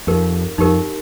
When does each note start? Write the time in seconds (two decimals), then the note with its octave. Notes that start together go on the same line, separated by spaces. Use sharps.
0.07 F2 D#4 G4 A#4
0.58 F2 D#4 G4 A#4